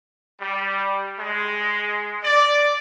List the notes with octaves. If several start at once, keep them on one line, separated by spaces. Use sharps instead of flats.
G3
G#3
D5